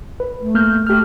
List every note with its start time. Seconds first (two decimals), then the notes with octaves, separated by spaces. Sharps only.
0.20 B4
0.41 A3
0.55 A#3 F6 G6
0.87 A3 G4 F6